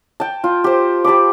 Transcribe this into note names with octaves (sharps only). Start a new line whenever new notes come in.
G5 A5
F4
G4 C5
G4 A5 B5 D6